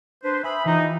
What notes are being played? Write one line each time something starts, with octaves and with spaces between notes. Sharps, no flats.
D4 B4 C5
E5 G#5 B5 D#6
E3 D#4 F4 G4